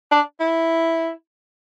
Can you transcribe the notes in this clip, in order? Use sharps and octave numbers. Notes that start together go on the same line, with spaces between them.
D4
E4